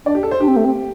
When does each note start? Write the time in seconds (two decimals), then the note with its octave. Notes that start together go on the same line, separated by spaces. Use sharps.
0.06 D4 D5
0.15 G4
0.23 A4
0.31 C5
0.40 D4 G4
0.48 C4
0.57 A3
0.65 C4